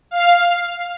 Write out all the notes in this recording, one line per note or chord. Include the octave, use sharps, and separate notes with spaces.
F5